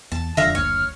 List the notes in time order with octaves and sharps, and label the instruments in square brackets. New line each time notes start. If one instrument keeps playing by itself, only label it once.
[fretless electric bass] E2 [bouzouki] A5
[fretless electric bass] E1 F2 D3 [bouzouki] E5 F5 [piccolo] A#6
[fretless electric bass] F#1 D2 [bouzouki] C#5 [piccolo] F6